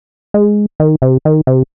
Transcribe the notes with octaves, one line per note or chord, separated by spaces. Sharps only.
G#3
D#3
C3
D#3
C3